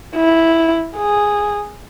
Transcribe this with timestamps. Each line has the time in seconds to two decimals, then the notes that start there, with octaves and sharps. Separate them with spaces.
0.16 E4
0.96 G#4